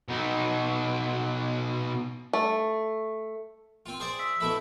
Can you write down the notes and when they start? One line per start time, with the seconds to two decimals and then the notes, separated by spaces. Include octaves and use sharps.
0.09 B2 D#4
2.33 A3
3.86 C4 F4
4.00 G#4 C5 D5
4.19 E5
4.40 B2 A3 E4